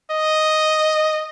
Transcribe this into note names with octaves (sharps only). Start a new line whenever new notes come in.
D#5